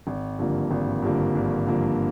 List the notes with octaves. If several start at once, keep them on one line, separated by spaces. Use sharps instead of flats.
G#1
G2 D3 F3 A#3
G#1
G2 D3 F3 A#3
G#1
G2 D3 F3 A#3